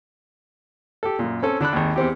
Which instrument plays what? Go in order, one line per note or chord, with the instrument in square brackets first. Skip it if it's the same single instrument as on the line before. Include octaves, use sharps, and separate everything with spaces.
[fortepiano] G4 A4
F#2 A#2
C4 C#4 A4
D3 D4 B5 F#6
G#1 D#2
E2 C4 G4